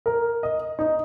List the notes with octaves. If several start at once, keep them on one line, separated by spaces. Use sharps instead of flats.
A#4
D#5
D#4